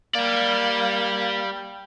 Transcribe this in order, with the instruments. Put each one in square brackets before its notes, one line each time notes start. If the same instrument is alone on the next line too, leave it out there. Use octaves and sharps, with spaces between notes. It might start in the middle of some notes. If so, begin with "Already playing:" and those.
[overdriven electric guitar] G3 D5 [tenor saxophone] A#3